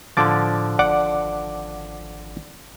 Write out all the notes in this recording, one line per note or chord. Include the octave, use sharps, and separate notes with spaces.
A2 D3 F3 D6 A6
G#1 D5 F#5 D6